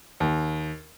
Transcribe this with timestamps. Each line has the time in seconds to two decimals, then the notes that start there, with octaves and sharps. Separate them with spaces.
0.20 D#2